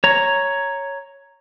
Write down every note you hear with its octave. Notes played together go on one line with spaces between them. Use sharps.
C#5 A#5